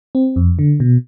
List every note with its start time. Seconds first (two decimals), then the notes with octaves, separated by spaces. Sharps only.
0.15 C4
0.36 F2
0.59 D3
0.80 B2